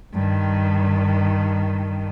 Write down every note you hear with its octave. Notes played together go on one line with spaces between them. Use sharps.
G2 D#3